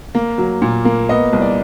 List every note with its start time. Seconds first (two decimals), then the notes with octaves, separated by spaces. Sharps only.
0.15 A#3
0.38 F#3
0.62 A#2
0.85 A#3
1.09 B3 D#5
1.33 C2
1.41 D5